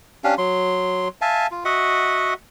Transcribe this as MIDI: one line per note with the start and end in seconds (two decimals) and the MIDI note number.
0.24 0.35 61
0.24 0.35 62
0.24 0.35 67
0.24 0.35 77
0.38 1.08 54
0.38 1.08 84
1.21 1.47 76
1.21 1.47 77
1.21 1.47 80
1.21 1.47 81
1.51 1.64 65
1.65 2.34 66
1.65 2.34 75
1.65 2.34 76
1.65 2.34 78